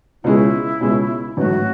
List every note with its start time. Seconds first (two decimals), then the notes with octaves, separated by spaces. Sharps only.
0.24 C#2 B2 G#3 C#4 E4 G#4
0.80 C#2 B2 G#3 C#4 G#4
1.37 A1 G#2 F#3 A3 F#4